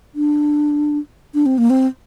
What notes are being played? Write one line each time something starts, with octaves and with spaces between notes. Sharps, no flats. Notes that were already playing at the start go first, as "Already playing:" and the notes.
D4
D4
C4
A#3
C4